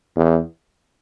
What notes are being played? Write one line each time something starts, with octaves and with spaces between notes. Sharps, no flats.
E2